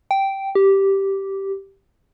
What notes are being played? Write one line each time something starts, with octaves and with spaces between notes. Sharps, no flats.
G5
G4